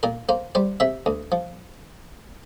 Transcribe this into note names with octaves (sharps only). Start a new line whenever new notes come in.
A#2 A#4
A#3 C5
G3 C5
C3 E5
D2
F3